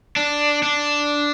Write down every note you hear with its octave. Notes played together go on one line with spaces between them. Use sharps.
D4
D4